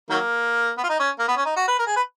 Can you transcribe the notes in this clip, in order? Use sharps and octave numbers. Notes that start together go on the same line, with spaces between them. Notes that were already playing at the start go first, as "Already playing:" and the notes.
D#3 F#3 A#3
B3
F4
D#4
C#4
A#3
B3
C#4
D#4
F#4
B4
A#4
G#4
B4